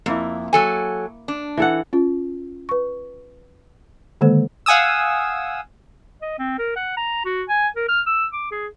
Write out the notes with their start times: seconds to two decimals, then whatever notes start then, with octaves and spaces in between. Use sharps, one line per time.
0.06 F2 A#3 E4
0.53 F#3 A4 G#5
1.28 D4
1.57 E3 A4 F#5
1.93 C#4 F4
2.69 B4 C#6
4.21 D3 D#3 G#3 A#3 A4 C5
4.66 F5 F#5 G#5 D#6 E6
6.22 D#5
6.39 C4
6.59 A#4
6.76 F#5
6.97 A#5
7.25 F#4
7.49 G#5
7.76 A#4
7.88 F6
8.06 E6
8.33 D6
8.51 G#4